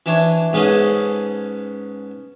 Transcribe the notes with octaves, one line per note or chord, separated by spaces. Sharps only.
E3 D4 C#5
G#2 B3 C#4 G#4 A4